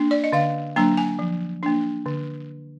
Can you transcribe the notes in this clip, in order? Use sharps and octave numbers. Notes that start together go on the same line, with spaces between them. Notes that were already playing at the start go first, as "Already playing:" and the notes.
Already playing: A#3 D4
D5
D#5
D3 F5
F#3 A#3 D4 A#5
G#5
F3
A#3 D4
D3